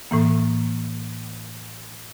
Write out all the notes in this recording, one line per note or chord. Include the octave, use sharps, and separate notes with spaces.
A2 E3 A#3